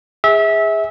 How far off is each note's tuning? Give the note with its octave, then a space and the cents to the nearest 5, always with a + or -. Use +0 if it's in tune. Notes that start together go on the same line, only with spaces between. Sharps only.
G#4 -15 E5 -25